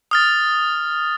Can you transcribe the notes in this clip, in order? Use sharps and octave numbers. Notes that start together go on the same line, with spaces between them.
D#6 F6 A6